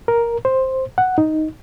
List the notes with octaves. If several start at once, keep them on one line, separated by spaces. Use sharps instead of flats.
A#4
C5
F#5
D#4